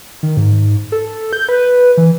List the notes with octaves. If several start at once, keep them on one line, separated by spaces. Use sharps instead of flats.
D#3
G#2
A4
G6
B4
E3